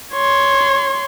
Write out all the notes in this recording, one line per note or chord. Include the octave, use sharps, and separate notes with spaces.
C#5 C6